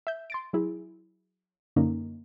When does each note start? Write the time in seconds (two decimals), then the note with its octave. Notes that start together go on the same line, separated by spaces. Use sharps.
0.07 E5 G6
0.30 C6 A6 D7
0.53 F#3 E4 G#4
1.76 F#2 D3 A#3 C#4 D#4